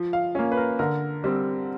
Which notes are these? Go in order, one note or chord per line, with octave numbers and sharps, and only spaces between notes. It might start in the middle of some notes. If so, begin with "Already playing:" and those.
Already playing: F3
F5
A#3 C#4
B4
A#4
D3 A#4
G3 C4